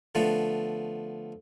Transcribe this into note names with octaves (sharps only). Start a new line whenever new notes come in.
D3 F3 A3 B3